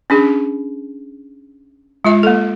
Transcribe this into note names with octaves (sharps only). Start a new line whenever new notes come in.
C#4 D4 G#4
G#3 F4 E5
A#3 A4